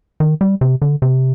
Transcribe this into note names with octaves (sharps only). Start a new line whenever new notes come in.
D#3
G3
C3
D3
C3